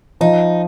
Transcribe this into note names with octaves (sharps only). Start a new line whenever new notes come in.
F3 D#4